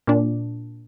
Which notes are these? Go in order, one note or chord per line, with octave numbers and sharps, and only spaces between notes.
A#2 D4